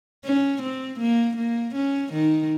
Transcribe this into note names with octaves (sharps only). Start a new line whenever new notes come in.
C#4
C4
A#3
A#3
C#4
D#3